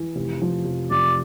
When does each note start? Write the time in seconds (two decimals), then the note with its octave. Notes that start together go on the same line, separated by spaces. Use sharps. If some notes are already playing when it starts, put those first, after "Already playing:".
Already playing: E3
0.16 F1
0.42 F3
0.65 F1
0.91 F1 D5